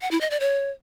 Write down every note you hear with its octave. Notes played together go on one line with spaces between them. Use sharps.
F#5
E4
D#5
D5
C#5